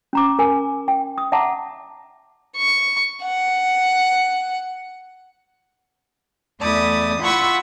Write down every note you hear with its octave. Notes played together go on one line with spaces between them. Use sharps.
C#4 A#5 D6
A#4 G#5
G5
D#6
E5 F#5 A5 A#5 D6
C#6
F#5
E2 A3 E4 D5 D#6
E4 F4 B4 F#5 C#6 E6